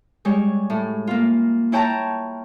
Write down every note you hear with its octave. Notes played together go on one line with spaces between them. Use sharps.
G3 G#3 C#5
A2
A#3 F4
E4 C#5 G5 A5 A#5